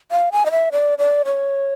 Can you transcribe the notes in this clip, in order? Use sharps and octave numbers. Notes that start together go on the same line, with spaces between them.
F5
G#5
D#5
E5
D5
D5
C#5